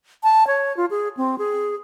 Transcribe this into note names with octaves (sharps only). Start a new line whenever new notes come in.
A5
C#5
F4
G#4
C4
G#4